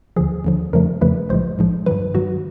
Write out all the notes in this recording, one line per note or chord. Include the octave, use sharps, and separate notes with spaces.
D#2 D3 F3 G#4
D#2 D3 F3
F2 C#3 F3 A3 A#4
F2 C#3 F3 A3 B4
B1 A2 F3 G#3 C5
B1 A2 F3 G#3
G2 D#3 F#3 B4
G2 D#3 F#3 F#4